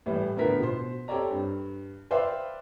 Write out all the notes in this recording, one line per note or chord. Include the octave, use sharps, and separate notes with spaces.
A2 E3 G3
A2 D3 F3 B3 A#4 B6
B2 C5
C4 G4 A4 C#5 D5 A#5
G2
B4 C5 D5 E5 F5 G5